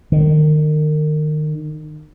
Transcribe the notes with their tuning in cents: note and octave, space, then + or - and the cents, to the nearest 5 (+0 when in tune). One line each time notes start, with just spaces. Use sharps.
D#3 -30